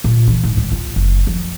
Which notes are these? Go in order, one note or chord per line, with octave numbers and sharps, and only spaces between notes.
A#2
E3
G#2
C#2
F4
F#1
F3